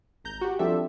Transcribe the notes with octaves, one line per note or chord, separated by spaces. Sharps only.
G#1 A#5 G6
F#4 G4
F3 G3 C4 D4 A4 E5